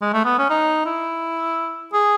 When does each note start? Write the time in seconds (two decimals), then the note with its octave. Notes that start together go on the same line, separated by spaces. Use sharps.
0.02 G#3
0.13 A3
0.25 B3
0.38 C#4
0.50 D#4
0.86 E4
1.93 G#4